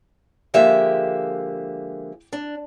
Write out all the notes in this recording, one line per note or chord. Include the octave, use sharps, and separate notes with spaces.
D3 F3 G#3 A#3 G4 E5
D4